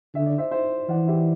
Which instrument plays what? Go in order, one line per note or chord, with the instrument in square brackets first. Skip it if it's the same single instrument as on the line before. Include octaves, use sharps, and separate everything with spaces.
[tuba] D3 [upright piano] E5
[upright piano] D5
C5 E5
C5 E5
[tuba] E3 [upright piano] D5 F#5
[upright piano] E4 G4